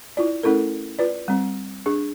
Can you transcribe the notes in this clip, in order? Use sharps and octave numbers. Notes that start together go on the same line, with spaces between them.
E4 F4 D5
A3 C#4 E4 A4 A#4
F4 B4 D5
G3 C4
D4 G#4